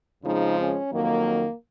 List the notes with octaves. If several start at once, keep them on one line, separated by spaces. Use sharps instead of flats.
F2 C#3 F3 G#3 D#4
C#4
F2 D#3 F#3 A#3